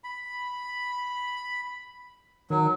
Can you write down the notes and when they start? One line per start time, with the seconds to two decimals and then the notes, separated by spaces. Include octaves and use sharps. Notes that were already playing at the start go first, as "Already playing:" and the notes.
0.04 B5
2.50 D#3 F#3